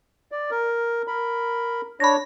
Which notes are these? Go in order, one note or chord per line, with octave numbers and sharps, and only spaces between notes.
D5
A#4
A#4 B5
D4 C#5 B5 A#6